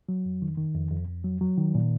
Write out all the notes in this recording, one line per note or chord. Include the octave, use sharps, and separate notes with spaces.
F#3
F2
D#3
D#3
F2
F2
F2
F#3
F#3
D#3
A#2